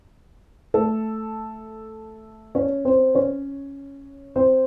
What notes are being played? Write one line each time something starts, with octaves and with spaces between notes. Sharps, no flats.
A3 A4
C#4 C#5
C4 C5
C#4 C#5
C4 C5